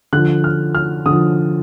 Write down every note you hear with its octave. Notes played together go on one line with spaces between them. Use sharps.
D3 F3 F#6
F6
F6
D3 F3 D#6